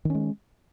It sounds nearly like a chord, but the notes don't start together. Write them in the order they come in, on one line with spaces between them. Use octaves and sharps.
D#3 C#4 G#3